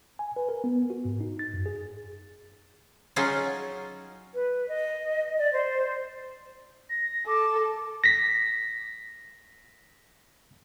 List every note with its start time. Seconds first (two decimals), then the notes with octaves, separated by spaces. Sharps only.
0.19 G#5
0.36 B4
0.49 A#4
0.64 B3
0.90 F#4
1.05 G#2
1.20 D#4
1.39 A6
1.54 F#2
1.66 G#4
3.16 F#3 C#4 D#4 F4 G#4
4.34 B4
4.69 D#5
5.38 D5
5.53 C5
6.89 A#6
7.27 A4 D6
8.04 A#6 B6